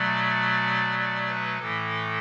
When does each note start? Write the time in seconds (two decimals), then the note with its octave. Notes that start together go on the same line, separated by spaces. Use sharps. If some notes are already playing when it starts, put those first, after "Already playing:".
Already playing: B2 F#3 A3 D5
0.99 D5
1.28 B4
1.59 A2 E3 A3 A4